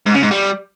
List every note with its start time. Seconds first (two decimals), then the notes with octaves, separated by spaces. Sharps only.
0.06 G#2
0.15 C#3
0.23 G#2
0.31 G3